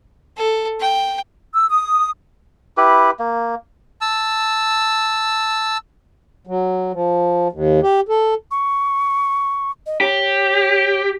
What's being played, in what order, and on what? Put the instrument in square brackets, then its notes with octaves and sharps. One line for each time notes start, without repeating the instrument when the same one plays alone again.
[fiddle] A4
G5
[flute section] E6
D#6
[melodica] E4 G4 B4
A#3
[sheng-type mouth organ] A5 E6
[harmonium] F#3
F3
D#2
G4
A4
[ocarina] C#6
D#5
[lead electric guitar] G4 [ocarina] C#5